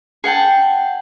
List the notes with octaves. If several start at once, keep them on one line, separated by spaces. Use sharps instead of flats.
G#4 F#5 G5 A5